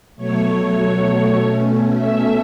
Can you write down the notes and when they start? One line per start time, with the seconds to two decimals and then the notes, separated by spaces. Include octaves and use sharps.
0.16 B2 F#3 A3 C#5
1.36 B2 A3 C#4
1.97 E5